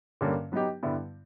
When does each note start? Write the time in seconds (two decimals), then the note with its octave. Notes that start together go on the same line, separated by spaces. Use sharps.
0.21 G2 D3 G3 A#3 C#4
0.52 F#3 B3 D#4 G4
0.83 G2 D3 G3 B3 E4